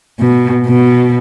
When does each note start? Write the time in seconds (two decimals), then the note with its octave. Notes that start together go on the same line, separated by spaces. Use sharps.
0.19 B2
0.67 B2